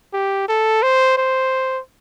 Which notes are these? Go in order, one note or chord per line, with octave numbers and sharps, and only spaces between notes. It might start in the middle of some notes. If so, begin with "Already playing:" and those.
G4
A4
C5
C5